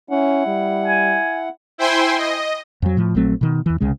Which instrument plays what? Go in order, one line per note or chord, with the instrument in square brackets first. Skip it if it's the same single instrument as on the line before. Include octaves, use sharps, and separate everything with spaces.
[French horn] C#4 [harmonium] E4 F#5
[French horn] G3
[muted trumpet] G#5
[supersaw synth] E4 C5 G5 G#5 C6
D#5
[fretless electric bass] F2 F#3
A2 F3
A#1 F#3 A3 C4
B2 D#3
E2 E3
C2 C#3 G#3